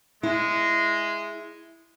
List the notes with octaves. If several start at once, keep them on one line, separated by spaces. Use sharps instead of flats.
G#3 E4